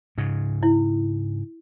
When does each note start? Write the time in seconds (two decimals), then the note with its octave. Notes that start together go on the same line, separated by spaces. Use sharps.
0.18 G#2 C#3
0.63 E4